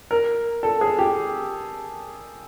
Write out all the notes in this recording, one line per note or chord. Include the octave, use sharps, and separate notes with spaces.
A#4
A4
G#4
G4